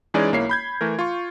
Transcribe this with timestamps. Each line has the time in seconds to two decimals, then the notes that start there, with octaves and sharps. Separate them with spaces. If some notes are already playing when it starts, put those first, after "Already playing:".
0.14 E3 G#3 C#4 D#4 G#4 D5
0.32 B1 A#3 E4 C#5 C7
0.49 B5 G6 G#6
0.81 E3 A3 A#4
0.99 F4 C#6